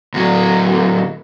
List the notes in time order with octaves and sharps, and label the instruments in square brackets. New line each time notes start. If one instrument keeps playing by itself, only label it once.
[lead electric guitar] D2 F#3